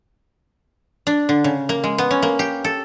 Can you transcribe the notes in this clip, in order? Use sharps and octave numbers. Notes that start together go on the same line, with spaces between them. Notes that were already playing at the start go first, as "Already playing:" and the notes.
D4
D3
C#3
A#3
G#3
B3
C#4
A#3
G4
A4